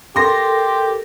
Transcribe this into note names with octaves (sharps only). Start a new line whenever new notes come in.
G4 A4 A#4 C6 A#6